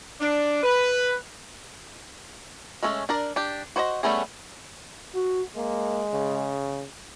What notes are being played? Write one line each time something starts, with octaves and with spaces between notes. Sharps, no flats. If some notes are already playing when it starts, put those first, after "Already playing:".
D4
B4
G#3 A3 C#4 A4
D4 A#4 D5
D4 G4
F#4 C5 D5 D#5
G3 A3 B3 C#4 G#4
F#4
G#3 A#3
C#3